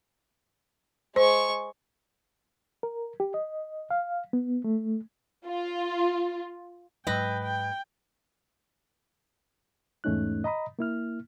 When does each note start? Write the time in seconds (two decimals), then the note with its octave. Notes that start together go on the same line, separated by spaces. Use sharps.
1.16 G#3 C5 C#6
2.83 A#4
3.20 G4
3.34 D#5
3.91 F5
4.33 B3
4.64 A3
5.46 F4
7.07 G#2 F#3 G#3 B4 D#5 G5
7.45 G5
10.04 E2 G#2 A3 C#4 D#4 F#6
10.44 D#5 A#5 B5 D#6
10.79 A#3 E4 F6